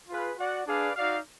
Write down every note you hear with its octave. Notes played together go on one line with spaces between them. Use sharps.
F4 G#4 B4 F5
F#4 D5 F#5
D4 G#4 B4 D5 F5
D#4 F#4 D5 F5